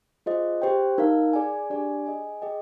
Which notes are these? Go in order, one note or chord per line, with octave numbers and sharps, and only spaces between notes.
F4 G#4 C5 D#5
G4 C5 G5
D#4 A#4 F5
G#4 D5 G#5
D4 G4 D5 G#5
G#4 D#5 G#5
G#4 D#5 G5